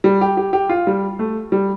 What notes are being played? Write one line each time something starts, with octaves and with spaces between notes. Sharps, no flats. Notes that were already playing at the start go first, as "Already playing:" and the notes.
G3
G4
G4
G4
F4
G3
A3
G3